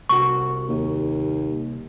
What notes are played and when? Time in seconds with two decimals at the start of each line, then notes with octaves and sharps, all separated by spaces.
0.09 C2 F#4 C#6
0.69 D#2